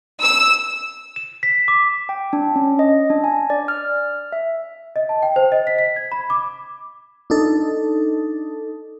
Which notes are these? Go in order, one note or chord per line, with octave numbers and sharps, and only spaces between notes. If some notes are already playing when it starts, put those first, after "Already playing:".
E6
E7
B6
D6
G5
D4
C#4
D#5
D4
G#5
D5
F6
E5
D#5
A5
G5
C5
D#5
B6
B6
G#6
B5
D6
D4 D#4 A4